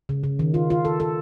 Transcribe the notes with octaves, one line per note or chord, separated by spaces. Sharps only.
C#3
C#3
D#3
F4
F4
A4
A4